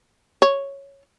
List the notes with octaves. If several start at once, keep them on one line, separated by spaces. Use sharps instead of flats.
C#5